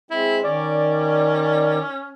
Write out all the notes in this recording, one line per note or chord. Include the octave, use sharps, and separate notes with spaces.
G#3 C4 E4
D#3 C#4 D5